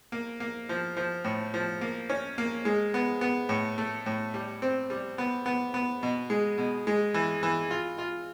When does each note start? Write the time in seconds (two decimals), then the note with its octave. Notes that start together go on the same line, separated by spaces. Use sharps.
0.12 A#3
0.40 A#3
0.69 F3
0.97 F3
1.24 A2
1.54 F3
1.81 A#3
2.10 C#4
2.38 A#3
2.65 G#3
2.94 B3
3.21 B3
3.49 A2
3.78 A3
4.06 A2
4.34 G3
4.62 C4
4.90 G3
5.18 B3
5.46 B3
5.74 B3
6.03 B2
6.30 G#3
6.58 B2
6.87 G#3
7.14 E3
7.43 E3
7.71 F4
7.98 F4